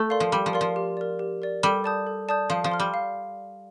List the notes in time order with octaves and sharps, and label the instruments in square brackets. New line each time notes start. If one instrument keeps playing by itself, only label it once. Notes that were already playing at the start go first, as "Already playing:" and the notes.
Already playing: [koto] A3
[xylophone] A#4 D5 F5 C6
[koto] F3
[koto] G3 [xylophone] G4
[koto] F3
[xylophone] A#4 D5 F5 C6
[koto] F3
[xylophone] G4
A#4 D5
G4
A#4 D5
[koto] G3 [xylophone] A4
[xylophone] D5 A5 D#6 G6
A4
D5 A5 D#6 G6
[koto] F3 [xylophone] F5
[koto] F3
[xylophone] C6 F6
[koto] G3
[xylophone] F5